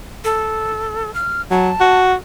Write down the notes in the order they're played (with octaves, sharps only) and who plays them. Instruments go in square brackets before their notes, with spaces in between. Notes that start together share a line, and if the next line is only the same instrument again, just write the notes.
[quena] A4
F6
[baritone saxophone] F#3 [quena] A5
[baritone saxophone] F#4